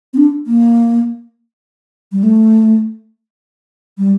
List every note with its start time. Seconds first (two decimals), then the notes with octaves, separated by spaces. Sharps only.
0.14 C4
0.17 D4
0.47 A#3
2.12 G3
2.23 A3
3.98 G3